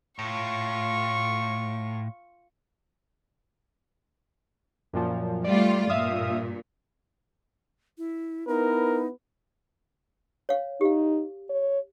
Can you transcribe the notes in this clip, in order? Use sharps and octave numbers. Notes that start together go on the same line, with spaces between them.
A2 F4 C#6
F#2 A#2 F3
G3 A3 F4 D5
G2 A#2 E5 F5 D#6
E4
B3 D#4 E4 A#4 B4
C#5 F5
D#4 G4 F5
C#5